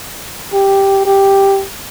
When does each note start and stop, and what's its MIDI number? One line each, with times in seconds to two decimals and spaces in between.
0.53 1.01 67
1.05 1.64 67